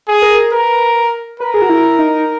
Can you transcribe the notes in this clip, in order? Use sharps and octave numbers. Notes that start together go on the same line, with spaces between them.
G#4
A#4
A#4 B4
A#4 B4
G#4
F#4
E4
D#4